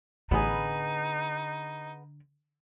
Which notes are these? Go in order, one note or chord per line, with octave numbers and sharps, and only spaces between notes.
A1 D3 B3 D#4 G#4